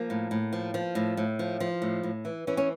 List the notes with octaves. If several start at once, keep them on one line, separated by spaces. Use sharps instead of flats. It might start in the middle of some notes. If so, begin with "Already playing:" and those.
Already playing: F3 A#3
A2
A2
F3
F3
A2
A2
F3
F3
A2
A2
E3
E3 C#4
C#4